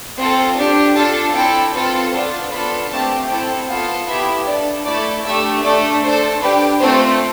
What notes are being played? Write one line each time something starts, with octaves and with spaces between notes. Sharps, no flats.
C4 F4 A4
D4 G4
D4 F4 A4 A5
C4 E4 A4 G5
C4 F4 A4 B4
B3 D4 F4 C5
B3 D4 F4 A4 B5
A3 C4 G4 A5
C4 E4 A4 G5
B3 F4 A4 F5
B3 E4 G4 E5
D4 A4 D5
A3 E4 A4 D5
A3 D4 G4 E5
A3 D4 A4 D5
D4 A4 C5
D4 G4 B4
A3 C4 F4 A4 C5